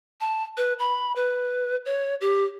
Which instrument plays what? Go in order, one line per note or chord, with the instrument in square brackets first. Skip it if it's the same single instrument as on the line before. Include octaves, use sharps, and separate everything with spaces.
[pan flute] A5
B4
B5
B4
C#5
G4